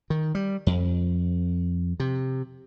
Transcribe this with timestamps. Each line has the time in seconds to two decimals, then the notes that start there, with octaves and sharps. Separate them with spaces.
0.10 D#3
0.35 G3
0.67 F2
2.00 C3